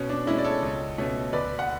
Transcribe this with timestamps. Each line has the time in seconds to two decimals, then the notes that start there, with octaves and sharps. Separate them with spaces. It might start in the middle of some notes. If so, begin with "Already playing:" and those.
Already playing: B2 C#4
0.09 D4
0.26 G#3 C#4 E4
0.38 D5
0.44 A4 C#5
0.63 C#2
0.98 B2 A3 C#4
1.33 D2 B4 D5
1.59 F#5